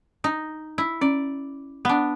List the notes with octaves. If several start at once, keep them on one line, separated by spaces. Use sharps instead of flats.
D#4
E4
C#4 D5
B3 D4 F#5